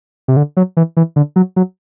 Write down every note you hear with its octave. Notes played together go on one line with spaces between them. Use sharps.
C3
D3
F#3
E3
E3
D3
F#3
F#3